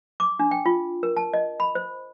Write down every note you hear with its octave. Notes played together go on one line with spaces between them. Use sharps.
D6
D4
G5
F4
A#4
A5
D#5
B5
C5